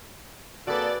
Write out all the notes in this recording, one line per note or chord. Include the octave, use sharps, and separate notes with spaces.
A#3 C4 F#4 G#4 A4 B4 D5 A6